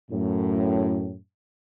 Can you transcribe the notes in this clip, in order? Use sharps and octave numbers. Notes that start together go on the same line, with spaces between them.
F#2 A2